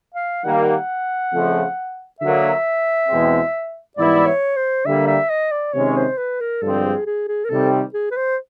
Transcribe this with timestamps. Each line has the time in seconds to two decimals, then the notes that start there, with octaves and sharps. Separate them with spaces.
0.14 F5
0.44 D#3 G3 A#3 F#5
0.53 F5
0.63 F#5
1.32 F2 C#3 F3 A3
2.20 D3 F#3 A#3 E5
3.08 E2 B2 G#3 C4
3.96 G#2 E3 G3 B3 E4 D5
4.26 C#5
4.56 C5
4.85 D3 G3 A#3 E5
5.07 E5
5.30 D#5
5.52 D5
5.73 C3 D#3 G#3 C#4 C#5
5.96 C5
6.17 B4
6.40 A#4
6.62 G2 D3 F3 G#3 C4 A4
6.83 G#4
7.06 G#4
7.28 G#4
7.45 A#4
7.50 C3 D#3 G3 C4 A4
7.94 G#4
8.11 B4
8.17 C5